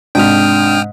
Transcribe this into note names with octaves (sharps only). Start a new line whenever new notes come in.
G#2 C3 D4 G5 D#6 F6